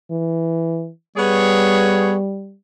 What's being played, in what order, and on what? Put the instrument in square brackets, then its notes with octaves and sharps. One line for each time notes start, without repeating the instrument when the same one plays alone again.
[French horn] E3
[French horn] G3 [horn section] B3 G#4 C#5